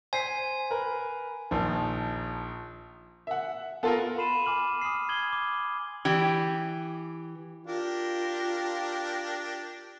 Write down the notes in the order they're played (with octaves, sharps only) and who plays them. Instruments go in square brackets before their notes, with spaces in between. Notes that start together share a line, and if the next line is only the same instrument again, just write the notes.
[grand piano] C5 B6 C7 [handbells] G#5
[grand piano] A#4 B4
A#1 D#3 F3
[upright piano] E5 F#5
[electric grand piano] B3 F4 A#4 [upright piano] A4 F#5 A5
[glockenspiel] B5 C6 C7 D#7 E7
G#5 D6 F6 F#7
D#6 F6 C7
D#6 G#6 F#7 G7
D6
[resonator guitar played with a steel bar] E3 G4
[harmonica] D4 G4 A#4 [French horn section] F4